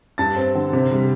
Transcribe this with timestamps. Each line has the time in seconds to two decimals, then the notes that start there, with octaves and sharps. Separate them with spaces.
0.18 G2 A5 A6
0.36 C4
0.55 D3
0.73 C3
0.91 G3